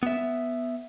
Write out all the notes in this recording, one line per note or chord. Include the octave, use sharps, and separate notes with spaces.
B3 E5